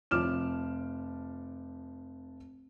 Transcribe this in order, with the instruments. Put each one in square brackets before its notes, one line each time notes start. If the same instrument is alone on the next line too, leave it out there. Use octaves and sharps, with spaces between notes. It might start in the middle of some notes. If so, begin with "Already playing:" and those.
[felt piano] F1 F3 D6 F6 E7